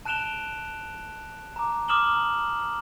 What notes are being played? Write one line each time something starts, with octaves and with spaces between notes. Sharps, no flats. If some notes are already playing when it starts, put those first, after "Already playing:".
A5 F#6 D7 E7 F7 G7
A#5 D6
D6 D#6 F6 E7 F#7 G7
A#5